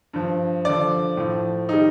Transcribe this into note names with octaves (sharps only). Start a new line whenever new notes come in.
G2 F3
G2 D3 F3 D5
A2 F3
D#3 G3 D#4